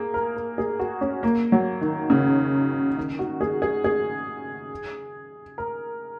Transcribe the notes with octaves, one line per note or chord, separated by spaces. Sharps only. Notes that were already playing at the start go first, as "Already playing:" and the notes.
Already playing: A#3 G#4
A#4
A#4
G#4
F#4
C#4
A#3
F#3
D#3
C#3
D#3
F#4
G#4
G#4
G#4
A#4